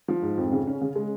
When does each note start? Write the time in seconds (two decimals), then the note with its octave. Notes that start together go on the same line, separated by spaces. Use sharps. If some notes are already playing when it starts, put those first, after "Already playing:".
0.08 F3
0.22 G#2
0.38 F2
0.52 C#3
0.67 C#4
0.81 C#3
0.96 G#3